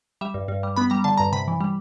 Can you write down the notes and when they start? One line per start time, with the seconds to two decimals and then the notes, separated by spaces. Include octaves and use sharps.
0.21 G3 E5
0.34 G2
0.48 G2
0.63 G3
0.76 B3 B5
0.90 G3 A#5
1.04 D3 A5
1.18 G2 A#5
1.32 C3 B5
1.48 E3
1.61 G3